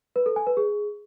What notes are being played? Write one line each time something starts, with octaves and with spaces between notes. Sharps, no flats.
B4
A4
G#5
B4
G#4